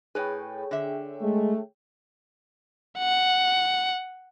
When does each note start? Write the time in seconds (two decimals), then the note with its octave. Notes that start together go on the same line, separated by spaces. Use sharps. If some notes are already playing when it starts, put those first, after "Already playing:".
0.15 A2 G#4 B4 C#5 G5
0.71 D3 E5
1.22 G#3 A3
2.99 F#5